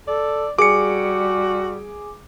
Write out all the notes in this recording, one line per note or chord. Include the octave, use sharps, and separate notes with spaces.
A4 D5
G3 F#4 G#4 D6 C#7